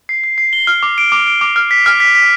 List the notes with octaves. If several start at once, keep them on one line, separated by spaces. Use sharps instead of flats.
C7
C7
C7
G7
F6
D6
D7
D6
D7
D6
F6
B6
F6
B6
B6